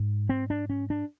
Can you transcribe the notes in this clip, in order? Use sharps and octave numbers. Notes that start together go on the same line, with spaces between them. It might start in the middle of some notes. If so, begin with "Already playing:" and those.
Already playing: G#2
C4
D4
C#4
D4